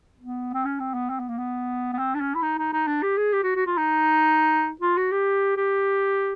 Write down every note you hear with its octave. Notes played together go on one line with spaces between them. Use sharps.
B3
C4
C#4
C4
B3
C4
B3
A#3
B3
B3
C4
D4
C#4
E4
D#4
D#4
D#4
D4
G4
G#4
G4
F#4
F#4
F4
D#4
F4
F#4
G4
G4